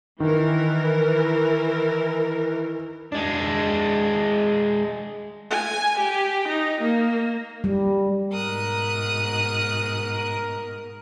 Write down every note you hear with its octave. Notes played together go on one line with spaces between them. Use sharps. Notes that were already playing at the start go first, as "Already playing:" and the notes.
D#3 E3 A#4
G#3 D4
G#5
G4
D#4
A#3
G3
G#2 B2 A#4 D#6 F#6